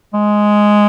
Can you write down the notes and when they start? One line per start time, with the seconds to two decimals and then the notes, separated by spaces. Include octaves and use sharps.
0.14 G#3